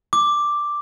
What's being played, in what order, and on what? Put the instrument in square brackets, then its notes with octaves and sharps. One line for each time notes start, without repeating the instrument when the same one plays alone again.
[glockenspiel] D6